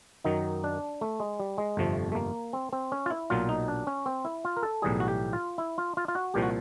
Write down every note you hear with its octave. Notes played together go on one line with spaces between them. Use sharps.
F#2 D#3 F#3 D#4
D4
A3
G#3
G3
G#3
G1 F2 C3 F3 A3
A3
A#3
C4
C4
C#4
F4
E4
B1 A#2 F#3 F4
D#4
D4
C#4
C4
E4
F4
A#4
A4
B1 A2 E3 G3 G#4
F#4
G4
F4
E4
F4
F4
F4
F#4
C2 A#2 F3 G4
F#4